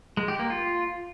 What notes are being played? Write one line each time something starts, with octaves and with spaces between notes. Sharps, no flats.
G#3
G4
A#3
F4